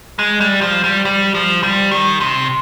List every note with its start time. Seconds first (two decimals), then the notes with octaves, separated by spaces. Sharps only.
0.19 G#3
0.40 G3
0.61 F3
0.84 G3
1.05 G3
1.34 F3
1.63 G3
1.91 D#3
2.20 C3